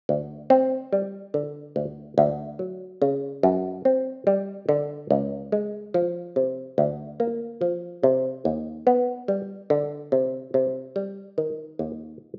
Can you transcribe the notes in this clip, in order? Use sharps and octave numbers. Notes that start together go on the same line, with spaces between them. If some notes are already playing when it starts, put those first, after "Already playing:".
D2
C4
G3
D3
D2
D2
F#3
C#3
F#2
C4
G3
D3
C#2
G#3
F3
C3
D2
A#3
F3
C3
D#2
B3
G3
D3
C3
C3
G3
D#3
D#2